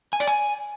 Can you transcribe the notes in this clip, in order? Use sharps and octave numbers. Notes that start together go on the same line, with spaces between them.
G#5
D5
G#5